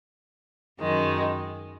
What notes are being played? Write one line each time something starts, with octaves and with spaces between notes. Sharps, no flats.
F#2 D#3 G#3